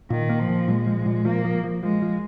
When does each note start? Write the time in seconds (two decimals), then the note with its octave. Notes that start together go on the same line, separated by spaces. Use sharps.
0.10 A#2 D#3
0.29 A#3
0.39 F3
0.49 A#2
0.68 A#2 G#3
0.87 F3
1.06 A#2
1.25 F3 A#3
1.45 F3
1.64 F3
1.82 F3 G#3
2.02 F3